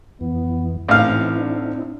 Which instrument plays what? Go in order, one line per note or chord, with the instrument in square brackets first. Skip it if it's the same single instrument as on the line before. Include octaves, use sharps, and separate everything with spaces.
[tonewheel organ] F2 E3 [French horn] B3
[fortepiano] A1 F5 [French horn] E3 [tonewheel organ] C4 D#4 E4
[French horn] D4